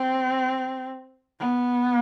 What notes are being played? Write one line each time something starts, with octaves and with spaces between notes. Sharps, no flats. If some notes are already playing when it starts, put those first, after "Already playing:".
Already playing: C4
B3